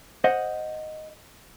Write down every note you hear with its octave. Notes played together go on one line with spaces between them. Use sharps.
C5 D#5 F#5